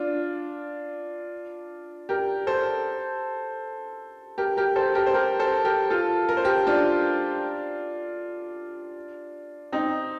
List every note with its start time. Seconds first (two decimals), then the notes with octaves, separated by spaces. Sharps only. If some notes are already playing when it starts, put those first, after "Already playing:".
Already playing: D4 F4
2.09 G4 A#4
2.47 A4 C5
4.38 G4 A#4
4.57 G4 A#4
4.76 A4 C5
4.95 G4 A#4
5.06 C5
5.14 G4 A#4
5.39 A4 C5
5.65 G4 A#4
5.90 F4 A4
6.29 A#4
6.37 C5
6.44 G4 A#4
6.67 D4 F4
9.72 C4 D#4